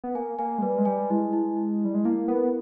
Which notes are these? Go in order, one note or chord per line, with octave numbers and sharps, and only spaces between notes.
B3
A#3 G#5
A#3 G#5
G#3
G3 B4
G#3
G3 G#5
G#3 E4
E4
E4
G3 E4
G#3
A#3 E4
B3 A#4